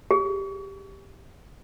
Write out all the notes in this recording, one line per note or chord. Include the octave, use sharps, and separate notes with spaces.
G4 G#4